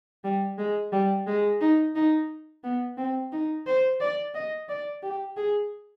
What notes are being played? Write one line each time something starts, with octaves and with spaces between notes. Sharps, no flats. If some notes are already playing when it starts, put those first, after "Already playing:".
G3
G#3
G3
G#3
D#4
D#4
B3
C4
D#4
C5
D5
D#5
D5
G4
G#4